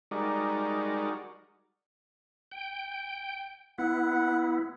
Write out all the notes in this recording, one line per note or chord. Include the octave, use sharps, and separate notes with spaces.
G3 G#3 D#4 F#4 A#4 D5
G5
B3 E4 F#5